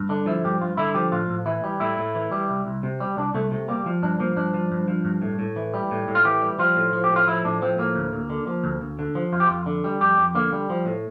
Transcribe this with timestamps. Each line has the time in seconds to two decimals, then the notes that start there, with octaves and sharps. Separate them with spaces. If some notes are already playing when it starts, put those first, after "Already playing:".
Already playing: G2
0.09 D3 D4
0.26 F3 E4
0.44 G2 G4
0.61 G2 F4
0.77 D3 E4
0.94 F3 G4
1.12 A2 F4
1.29 A2
1.46 E3 E4
1.64 G3
1.80 A2 E4
1.98 A2
2.15 E3
2.32 G3
2.49 C2
2.67 C2
2.83 C3
3.00 G3
3.17 C2 D4
3.34 C2 A3
3.51 C3 A3
3.68 G3 A#3
3.86 F3
4.02 G2 D4
4.20 F3 A#3
4.36 G2 D4
4.54 F3
4.72 G2
4.88 F3
5.05 G2
5.22 A2
5.39 A2
5.56 E3
5.74 G3
5.91 A2
6.08 A2
6.15 F4
6.25 E3 G4
6.42 G3
6.59 F3 F4
6.76 A2
6.93 F3
7.04 G4
7.11 A2
7.16 F4
7.27 F3 E4
7.45 A2 D4
7.62 F3 C4
7.78 A2 A#3
7.95 D2
8.13 D2
8.30 D3
8.47 F3
8.64 D2
8.81 D2
8.99 D3
9.15 F3
9.32 F2 F4
9.40 G4
9.47 F2 F4
9.66 D3
9.84 G3
10.01 F2 G4
10.18 F2
10.35 D3 A#3
10.53 G3
10.70 F3
10.86 A2